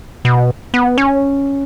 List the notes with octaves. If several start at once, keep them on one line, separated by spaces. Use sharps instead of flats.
B2
B3
C#4